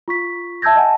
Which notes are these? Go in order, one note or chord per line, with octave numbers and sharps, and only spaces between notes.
F4 C#6 B6
E5 A5 E6 G6 G#6 A#6
D#5 F#5 G#5 A5